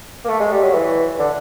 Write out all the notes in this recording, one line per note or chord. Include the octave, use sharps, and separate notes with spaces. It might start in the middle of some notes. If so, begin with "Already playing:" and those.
A#3
A3
G#3
G3
F#3
E3
D3